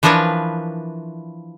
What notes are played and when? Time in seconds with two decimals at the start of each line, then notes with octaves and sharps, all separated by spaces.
0.03 E3 F3 D4 A#4 B4 C#5